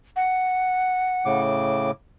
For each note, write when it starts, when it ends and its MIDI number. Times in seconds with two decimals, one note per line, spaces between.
0.16 1.40 78
1.25 1.91 45
1.25 1.91 49
1.25 1.91 86